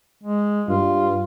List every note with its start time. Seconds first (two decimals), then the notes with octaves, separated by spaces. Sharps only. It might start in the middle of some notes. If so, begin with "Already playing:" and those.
0.24 G#3
0.68 G2 F4